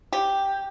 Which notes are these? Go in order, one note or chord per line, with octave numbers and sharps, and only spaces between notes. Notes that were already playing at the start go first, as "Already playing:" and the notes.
G4